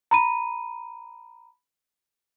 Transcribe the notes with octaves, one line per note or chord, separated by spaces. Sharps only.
A#5 B5 D#7